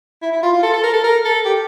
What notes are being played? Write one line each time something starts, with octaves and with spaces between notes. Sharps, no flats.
E4
E4
F4
F4
A4
A4
A#4
A4
A#4
A4
G4